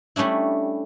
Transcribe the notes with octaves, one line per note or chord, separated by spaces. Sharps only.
G3 A3 C#4 D4 E4